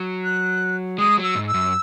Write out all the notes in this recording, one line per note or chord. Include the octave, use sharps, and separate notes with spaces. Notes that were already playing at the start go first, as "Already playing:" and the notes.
Already playing: F#3
F#6
G#3 D#6
F#3
E6
G#2
E6
F#2